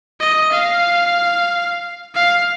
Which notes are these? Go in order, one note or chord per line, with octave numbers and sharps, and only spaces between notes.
D#5
F5
F5